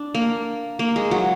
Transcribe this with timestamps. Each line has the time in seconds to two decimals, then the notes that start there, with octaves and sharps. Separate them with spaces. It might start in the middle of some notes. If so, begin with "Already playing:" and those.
Already playing: D4
0.15 A#3
0.79 A#3
0.96 G#3
1.11 F#3